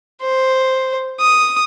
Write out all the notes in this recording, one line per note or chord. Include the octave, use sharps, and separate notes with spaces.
C5
D#6